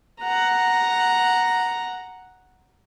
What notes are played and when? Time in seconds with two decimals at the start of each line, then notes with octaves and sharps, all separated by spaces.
0.21 F#5 A#5